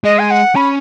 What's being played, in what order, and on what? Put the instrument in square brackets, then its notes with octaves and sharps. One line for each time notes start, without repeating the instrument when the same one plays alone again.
[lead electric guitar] G#3 [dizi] D#5
[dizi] G#5
F#5
[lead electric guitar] C#4 [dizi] B5